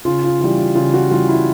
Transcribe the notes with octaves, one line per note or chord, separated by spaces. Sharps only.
C#3 F4
F4
E3 G3 F4
F4
C#3 F4
F#4
E3 G3 F4
E4